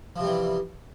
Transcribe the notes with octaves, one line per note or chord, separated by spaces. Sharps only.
C3 E3 F3 G3